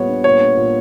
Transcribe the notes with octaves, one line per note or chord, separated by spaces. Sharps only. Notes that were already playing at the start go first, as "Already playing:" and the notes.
Already playing: A#2 G3 B3 C#5
D4
A#2 C#5
D4
A#2